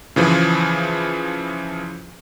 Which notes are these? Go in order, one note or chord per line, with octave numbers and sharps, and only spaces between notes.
C#3 E3 F3 G#4